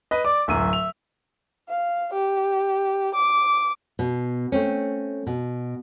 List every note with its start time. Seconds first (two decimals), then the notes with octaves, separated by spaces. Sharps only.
0.11 B4 D#5
0.25 D5 D6
0.48 D1 F#2 E5 D#7
0.73 F7
1.69 F5
2.13 G4
3.15 D6
3.99 B2
4.52 A3 C4 C#4
5.27 B2